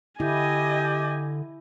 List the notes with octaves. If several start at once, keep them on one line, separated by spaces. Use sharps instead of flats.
D3 E4 G4 D#5 G#5